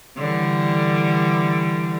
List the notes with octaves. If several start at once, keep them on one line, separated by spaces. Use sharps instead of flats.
D3 E3 G3